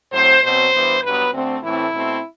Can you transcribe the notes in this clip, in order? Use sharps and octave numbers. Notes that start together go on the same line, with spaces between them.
A2 F#3 C4 C5
B2 F#3 C4 C5
G2 E3 B3
G2 F#3 B3 B4
D2 D3 A3 C4
A2 E3 A3 C4 E4
B2 A3 C4